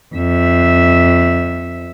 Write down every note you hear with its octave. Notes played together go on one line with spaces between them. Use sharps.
F2 E5